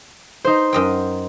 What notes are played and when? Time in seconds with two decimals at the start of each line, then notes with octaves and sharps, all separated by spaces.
0.45 D#4 C5
0.73 F#2 D#5 G5